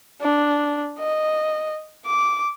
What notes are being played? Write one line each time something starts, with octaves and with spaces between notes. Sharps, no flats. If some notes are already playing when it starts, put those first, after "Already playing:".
D4
D#5
D6